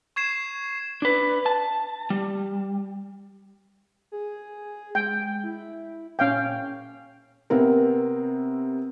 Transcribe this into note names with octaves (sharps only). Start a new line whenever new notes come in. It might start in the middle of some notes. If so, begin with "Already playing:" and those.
C#6 G#6 C7 E7
D4 B4
A5
G3
G#4
G#3 G5
E4
A#2 C#4 F5 G5
C3 B3 C4 A#4